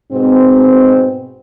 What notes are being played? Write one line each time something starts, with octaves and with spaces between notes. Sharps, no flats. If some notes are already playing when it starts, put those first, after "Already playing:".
G#2 B2 C4